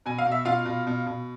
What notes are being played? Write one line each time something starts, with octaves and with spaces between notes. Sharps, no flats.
B2 G#5
F5
B2
E5
B2 F4 F5
B2
B2
B2